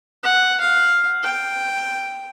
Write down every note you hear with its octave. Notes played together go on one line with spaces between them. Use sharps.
F#5
F5
G5